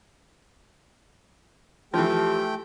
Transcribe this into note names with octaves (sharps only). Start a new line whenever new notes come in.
E3 F3 A3 G4 G5